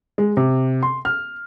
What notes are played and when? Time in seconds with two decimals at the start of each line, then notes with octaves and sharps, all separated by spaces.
0.18 G#3
0.37 C3
0.83 C6
1.05 F6